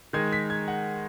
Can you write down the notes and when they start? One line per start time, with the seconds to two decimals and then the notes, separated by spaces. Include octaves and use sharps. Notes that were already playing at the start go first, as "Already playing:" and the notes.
0.13 D#3 G#3 D#4 G#6
0.33 B6
0.50 G#6
0.68 F#5